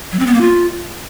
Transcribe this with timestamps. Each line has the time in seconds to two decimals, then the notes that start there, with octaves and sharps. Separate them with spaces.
0.12 F#3
0.19 C4
0.26 B3
0.34 A#3
0.41 F4